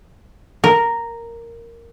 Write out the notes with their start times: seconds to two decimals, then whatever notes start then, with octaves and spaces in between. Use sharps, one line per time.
0.64 A#4